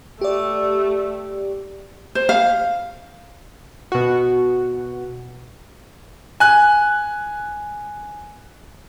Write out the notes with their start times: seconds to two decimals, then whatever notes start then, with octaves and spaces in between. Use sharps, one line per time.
0.21 A3 G4 D5
2.15 C5
2.29 F5
3.92 B2 F#4
6.40 G#5 F#6